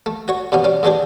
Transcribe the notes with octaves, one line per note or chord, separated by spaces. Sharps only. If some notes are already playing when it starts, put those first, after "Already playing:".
A3
F#4 C#5 C#6
G2 B2 B3 C#4
G3 C#4
G#2 E3 G#3 D4 G4 G#4